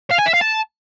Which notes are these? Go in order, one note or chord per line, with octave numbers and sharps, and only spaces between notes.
F5
G#5
E5
F5
A5